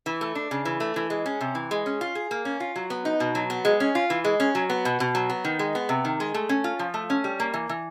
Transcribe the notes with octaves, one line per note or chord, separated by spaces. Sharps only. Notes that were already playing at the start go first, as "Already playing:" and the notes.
E3
A3
D4
C#3
E3
A3
E3
G#3
C#4
C3
E3
G#3
C#4
F4
G#4
A#3
C#4
F4
F#3
B3
D#4
B2
F#3
B3
G#3
C#4
F4
E3
G#3
C#4
F#3
B3
B2
B2
F#3
B3
D#3
G#3
B3
C3
D#3
G#3
A3
C#4
F4
F3
A3
C#4
G3
A#3
E3
E3